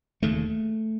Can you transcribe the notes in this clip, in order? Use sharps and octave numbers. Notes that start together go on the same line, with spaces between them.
E1 D#2 C#3 A3